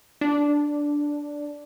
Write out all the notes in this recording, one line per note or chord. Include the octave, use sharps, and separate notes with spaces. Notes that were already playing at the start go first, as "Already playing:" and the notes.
D4